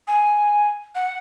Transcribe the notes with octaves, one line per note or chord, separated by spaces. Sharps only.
G#5
F#5